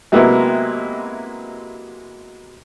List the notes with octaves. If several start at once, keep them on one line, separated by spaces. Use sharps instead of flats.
C3 F#3 G#3 A#3 B3 E4